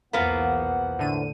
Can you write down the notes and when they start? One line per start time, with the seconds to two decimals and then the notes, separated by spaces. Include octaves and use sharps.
0.13 B1 E2 G#2 F3 A#3 B3 F#5
0.98 A2 D3 D#7